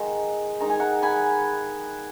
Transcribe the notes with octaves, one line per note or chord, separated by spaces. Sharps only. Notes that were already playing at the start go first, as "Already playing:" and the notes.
Already playing: D#3 G#3 D#4 F#5 A#5
D#3 G#3 D#4 A#5
G#5
F#5 A#5
G#5 B5